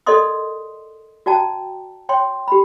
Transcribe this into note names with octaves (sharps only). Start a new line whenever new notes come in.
A4 A#4 D5 D#5 C6 D#6
F#4 D5 G5 A5 A#5
C#5 G5 C6
G4 B5